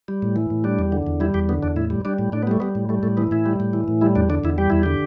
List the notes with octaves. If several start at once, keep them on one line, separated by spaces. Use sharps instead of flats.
G3
A2
E3
A2
G3 D4
E2
D3
E2
G3 E4
E2 G4
D3 B3
E2 D4
A2 E4
G3
G3 D4
A2
A2 D4
B3
G3 A3
G3 B3
A2
G3 A3
A2 A3
E3 B3
A2 E4
G3
A2
E3
A2
G3 E4
E2 D4
D3 D4
E2 E4
G3 G4
E2 E4
D3 G4